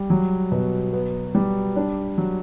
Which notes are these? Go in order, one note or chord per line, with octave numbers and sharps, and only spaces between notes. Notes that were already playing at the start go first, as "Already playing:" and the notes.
Already playing: G3
F#3
B2
B3
G3
D4
F#3